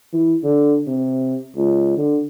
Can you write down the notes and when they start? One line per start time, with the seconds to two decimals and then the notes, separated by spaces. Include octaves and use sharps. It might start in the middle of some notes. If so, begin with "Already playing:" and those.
0.13 E3
0.43 D3
0.86 C3
1.56 C#2
1.97 D3